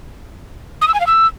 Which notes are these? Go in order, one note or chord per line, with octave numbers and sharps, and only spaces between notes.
D#6
E6
G#5
F5
E6